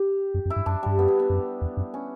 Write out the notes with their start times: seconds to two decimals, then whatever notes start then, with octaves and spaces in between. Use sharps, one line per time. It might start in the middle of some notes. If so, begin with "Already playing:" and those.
Already playing: G4
0.34 F#2
0.45 F#2
0.50 E4
0.56 G2
0.66 F#2 D4
0.83 G2 G3
0.98 F#2 B3
1.08 B3
1.20 B3
1.30 F#2
1.62 E2
1.77 F#2
1.94 C#4